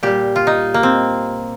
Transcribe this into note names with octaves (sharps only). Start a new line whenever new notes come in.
A#2 G3 G4
F4
D#4
A#3
C4